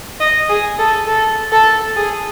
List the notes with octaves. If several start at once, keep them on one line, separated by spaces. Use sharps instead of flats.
D#5
G#4
A4
A4
A4
G#4